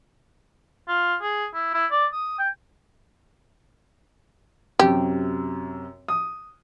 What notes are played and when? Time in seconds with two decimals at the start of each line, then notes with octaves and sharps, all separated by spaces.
0.88 F4
1.21 G#4
1.54 E4
1.74 E4
1.91 D5
2.13 D#6
2.39 G5
4.79 F#2 C3 G4
6.08 D#6